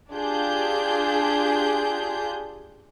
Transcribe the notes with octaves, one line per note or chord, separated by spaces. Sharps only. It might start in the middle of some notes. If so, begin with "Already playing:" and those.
D4 F4 G4 G#4 G6